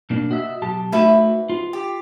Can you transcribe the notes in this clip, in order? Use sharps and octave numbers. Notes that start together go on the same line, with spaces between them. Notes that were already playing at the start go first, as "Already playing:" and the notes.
B2 A#3 D4
F#4 D#5 E5
B1 G4 A5
G#2 A3 F#4 B4 E5
F4
G4